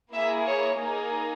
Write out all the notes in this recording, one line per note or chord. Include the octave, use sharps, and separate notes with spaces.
A#3 E4 G#4 E5
C#5
A#3 D#4 G#4